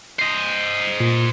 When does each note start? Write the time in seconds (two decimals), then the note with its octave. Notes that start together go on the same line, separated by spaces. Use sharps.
0.19 C5 D#5
1.00 A#2